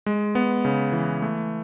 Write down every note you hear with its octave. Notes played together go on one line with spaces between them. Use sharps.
G#3
B3
C#3
E3
A3